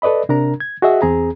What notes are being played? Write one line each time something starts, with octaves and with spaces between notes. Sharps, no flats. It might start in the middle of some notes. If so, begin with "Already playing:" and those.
A4 B4 D5 D#5 B5
C3 D4 A#4 A#5
G#6
F#4 G#4 D#5 E5 F#5
E2 C4 G#4 A#5